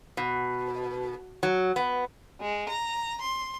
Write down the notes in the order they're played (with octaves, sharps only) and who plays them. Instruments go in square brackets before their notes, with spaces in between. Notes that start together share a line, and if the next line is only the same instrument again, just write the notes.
[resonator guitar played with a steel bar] B2
F#3
B3
[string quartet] G#3
A#5
C6